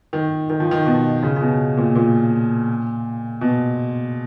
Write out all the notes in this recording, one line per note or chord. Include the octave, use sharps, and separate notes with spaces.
D#3
D#3
F3
D#3
B2
C#3
C#3
B2
A#2
A#2
B2